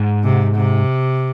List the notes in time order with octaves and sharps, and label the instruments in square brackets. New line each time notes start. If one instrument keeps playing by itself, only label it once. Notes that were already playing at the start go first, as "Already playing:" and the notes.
Already playing: [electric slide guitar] G#2
[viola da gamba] C3
C3